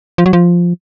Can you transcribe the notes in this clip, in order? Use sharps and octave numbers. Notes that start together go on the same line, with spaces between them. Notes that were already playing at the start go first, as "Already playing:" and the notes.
F3
F#3
F3